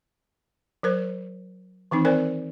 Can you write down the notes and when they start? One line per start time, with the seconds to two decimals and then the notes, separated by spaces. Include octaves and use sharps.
0.83 F#3 A#4 C5
1.91 D#3 E3 C4 D#4
2.05 C4 A#4 C5 D5 G#5